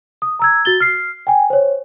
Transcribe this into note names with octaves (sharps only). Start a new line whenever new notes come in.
D#6
A#5 E6 G#6
F#4 A6 G7
F6 C7
G5 G#5
C5 C#5